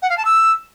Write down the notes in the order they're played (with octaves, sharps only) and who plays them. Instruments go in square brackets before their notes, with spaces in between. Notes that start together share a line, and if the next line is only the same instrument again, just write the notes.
[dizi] F#5
F5
A5
E6